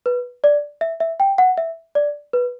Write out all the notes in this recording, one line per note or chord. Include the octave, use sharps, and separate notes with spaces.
B4
D5
E5
E5
G5
F#5
E5
D5
B4